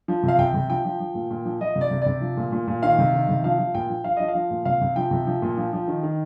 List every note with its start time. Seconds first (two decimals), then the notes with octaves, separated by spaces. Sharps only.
0.08 F3
0.23 C3 F5
0.39 C3 G5
0.54 C3
0.70 F3 G5
0.85 F3
1.00 F3
1.15 A#2
1.30 A#2
1.45 F3
1.60 F3 D#5
1.76 C3
1.81 D5
1.91 C3
2.02 C3 D5
2.21 F3
2.37 A#2
2.52 A#2
2.67 A#2
2.83 D#3 F5
2.99 C3
3.14 D#3
3.29 C3
3.44 F3 F5
3.59 F3
3.75 A#2 G5
3.89 F3
4.04 F3 F5
4.17 F3 D#5
4.28 F5
4.35 F3
4.51 A#2
4.65 C3 F5
4.81 C3
4.96 F3 G5
5.11 C3
5.27 F3
5.42 A#2
5.57 F3
5.73 F3
5.88 D#3
6.03 D#3